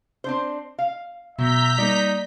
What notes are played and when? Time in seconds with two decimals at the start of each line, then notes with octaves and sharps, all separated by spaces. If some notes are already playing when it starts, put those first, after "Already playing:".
0.24 C4 D4 C5
0.78 F5
1.38 B2 F#3 E5 A#5 G6 B6
1.78 G3 A#3 D#4 D5